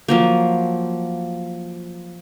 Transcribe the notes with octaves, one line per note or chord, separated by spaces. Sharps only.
F3 F#3 A#3